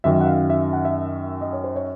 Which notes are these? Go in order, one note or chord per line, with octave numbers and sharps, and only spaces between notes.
F#2 D#3 F#3 E5
F#5
F5
E5
F#5
E5
D#5
C#5
C5
C#5